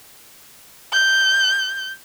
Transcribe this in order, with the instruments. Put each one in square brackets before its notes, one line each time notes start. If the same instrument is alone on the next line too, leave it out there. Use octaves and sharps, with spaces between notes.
[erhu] G6